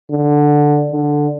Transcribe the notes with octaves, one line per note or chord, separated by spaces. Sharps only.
D3
D3